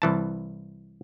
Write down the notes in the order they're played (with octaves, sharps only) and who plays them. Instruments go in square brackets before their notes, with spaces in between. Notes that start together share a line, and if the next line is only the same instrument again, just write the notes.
[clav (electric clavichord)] C2 E3 A5